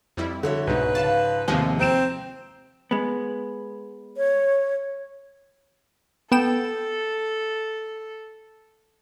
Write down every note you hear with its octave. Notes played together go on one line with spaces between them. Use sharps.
F2 G3 E4
D3 F#4 C#5 E5
C2 G#2 B2 B4
C#3 F3 A5
D#2 A2 C3 F3 G#3 G4 D#5
C4 A#5 D7 E7
G#3 B3
C#5
B3 A4 G5 E7